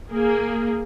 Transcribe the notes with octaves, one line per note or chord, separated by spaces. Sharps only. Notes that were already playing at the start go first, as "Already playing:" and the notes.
A#3 G#4